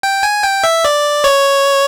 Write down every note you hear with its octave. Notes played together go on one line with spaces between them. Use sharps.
G5
G#5
G5
E5
D5
C#5